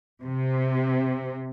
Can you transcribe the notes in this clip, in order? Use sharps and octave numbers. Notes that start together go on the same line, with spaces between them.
C3